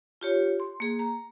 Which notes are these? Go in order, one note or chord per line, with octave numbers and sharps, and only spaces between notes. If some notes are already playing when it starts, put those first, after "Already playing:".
F4 G4 C#5
C6
A#3 G#4
A#5